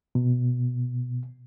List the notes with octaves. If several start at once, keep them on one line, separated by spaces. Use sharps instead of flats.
B2